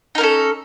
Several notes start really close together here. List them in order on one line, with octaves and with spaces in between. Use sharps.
D#4 A#4 C#4 A4